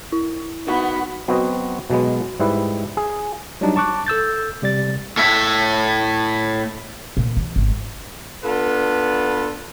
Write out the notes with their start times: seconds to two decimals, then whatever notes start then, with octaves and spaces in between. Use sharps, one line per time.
0.12 E4
0.67 D#3 B3 F#4
1.28 F#3 B3 C4 F#4 D#5
1.90 B2 F#3 G#3 B3
2.40 G#2 G3 E4 B4
2.97 G#4
3.61 F#3 G3 D4 D#4
3.76 A5 C#6 D6 F#6
4.06 A4 E6 G6 A6
4.62 C3 G3 D5 A6
5.17 A2 E5
7.17 A#2
7.37 E3
7.56 G#1
8.44 B3 D4 F4 A4 B4